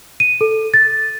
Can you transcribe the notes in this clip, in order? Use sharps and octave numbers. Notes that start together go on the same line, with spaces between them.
D#7
A4
A6